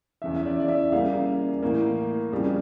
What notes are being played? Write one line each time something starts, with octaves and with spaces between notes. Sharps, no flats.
E2 C#3 E3 E5
E5
D5
D5
E5
C#3 G3 A#3 F5
A2 E3 A#3
F2 C#3 G3